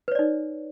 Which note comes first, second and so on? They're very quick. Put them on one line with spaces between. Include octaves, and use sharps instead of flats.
B4 C#5 D5 D#4